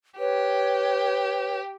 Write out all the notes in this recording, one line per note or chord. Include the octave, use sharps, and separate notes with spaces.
G4 B4 C#5